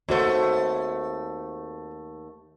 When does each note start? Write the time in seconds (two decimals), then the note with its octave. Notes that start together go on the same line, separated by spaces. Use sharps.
0.09 D#2 A3 C4 F#4 C5